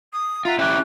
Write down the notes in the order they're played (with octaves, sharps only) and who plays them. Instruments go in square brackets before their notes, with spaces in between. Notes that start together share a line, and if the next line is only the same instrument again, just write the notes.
[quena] D#6
[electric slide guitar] F4 [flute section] E5 F#5 A#5 [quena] C6
[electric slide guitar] C#4 E4 G4 [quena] D6 [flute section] F#6